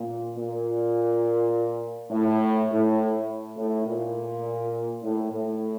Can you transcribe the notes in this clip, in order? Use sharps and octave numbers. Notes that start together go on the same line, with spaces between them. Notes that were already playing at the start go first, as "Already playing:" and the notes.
Already playing: A#2
A#2
A2
A2
A2
A#2
A2
A2